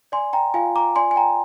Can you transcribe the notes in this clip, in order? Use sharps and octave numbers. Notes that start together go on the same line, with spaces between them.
D5 G#5 C6
G5 A#5
F4 F5 G#5
A#5 D6
D5 G#5 C6
G#5
G5 A#5